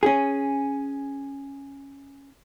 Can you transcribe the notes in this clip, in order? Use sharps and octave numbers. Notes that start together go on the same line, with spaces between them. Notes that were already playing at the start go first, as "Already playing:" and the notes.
C#4 G#4